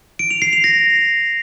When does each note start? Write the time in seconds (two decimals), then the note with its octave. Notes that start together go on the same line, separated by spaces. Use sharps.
0.19 D7
0.31 F7
0.42 C7
0.53 F7
0.64 A#6